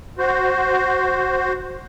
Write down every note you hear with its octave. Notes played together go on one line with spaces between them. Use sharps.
F#4 C5